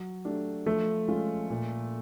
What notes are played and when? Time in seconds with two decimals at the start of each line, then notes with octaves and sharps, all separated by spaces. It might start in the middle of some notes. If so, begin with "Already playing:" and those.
Already playing: F#3
0.25 A3 D4 G4
0.66 F3 A3
1.08 G#3 C#4 F4
1.50 A#2